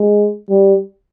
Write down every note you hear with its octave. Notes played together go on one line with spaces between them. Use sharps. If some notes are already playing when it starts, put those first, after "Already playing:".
Already playing: G#3
G3